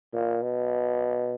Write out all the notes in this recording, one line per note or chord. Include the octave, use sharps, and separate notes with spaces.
A#2
B2